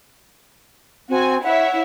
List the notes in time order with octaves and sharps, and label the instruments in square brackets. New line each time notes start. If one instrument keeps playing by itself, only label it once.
[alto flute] C4 [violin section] F#4 G#5
[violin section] E4 C#5 E5 [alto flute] F#5